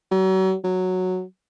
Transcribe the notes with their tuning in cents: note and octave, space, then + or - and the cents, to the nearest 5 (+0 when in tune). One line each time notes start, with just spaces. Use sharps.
F#3 +35
F#3 -5